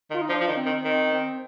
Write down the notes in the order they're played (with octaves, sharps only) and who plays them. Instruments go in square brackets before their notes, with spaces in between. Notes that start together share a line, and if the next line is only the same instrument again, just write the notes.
[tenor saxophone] D#3
[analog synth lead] F4
D#4
[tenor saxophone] F3 [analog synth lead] D4
[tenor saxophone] F3
D#3
[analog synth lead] C4
[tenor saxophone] D#3
[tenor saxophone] D#3 [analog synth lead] C4
[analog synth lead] C4